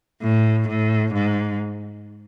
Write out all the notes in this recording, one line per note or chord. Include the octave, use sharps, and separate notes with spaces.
A2
A2
G#2